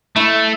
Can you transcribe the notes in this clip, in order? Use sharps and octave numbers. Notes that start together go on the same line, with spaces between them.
A3 E4